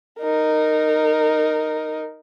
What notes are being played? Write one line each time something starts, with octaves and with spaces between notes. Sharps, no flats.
D#4 A#4